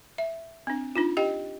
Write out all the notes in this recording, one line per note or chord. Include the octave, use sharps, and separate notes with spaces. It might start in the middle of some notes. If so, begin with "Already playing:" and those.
E5
C4 D4
D4 D#4 F4
G4 D#5 G5